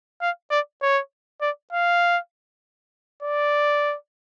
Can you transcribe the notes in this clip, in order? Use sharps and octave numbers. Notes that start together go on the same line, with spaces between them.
F5
D5
C#5
D5
F5
D5